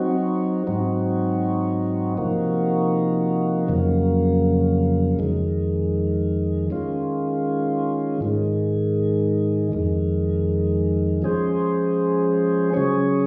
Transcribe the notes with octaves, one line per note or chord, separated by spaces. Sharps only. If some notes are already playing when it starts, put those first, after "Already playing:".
Already playing: F#3 C4 D#4 F#4
G#2 F#3 C4 D#4 F#4
C3 F3 A#3 D#4 F#4
F2 C#3 F#3 A#3
F2 D#3 G#3
D#3 G#3 C#4 F4
G#2 D#3 G#3
F2 D#3 G#3
F3 G#3 C#4 G#4 C5
C#3 F#3 C#4 G#4 C#5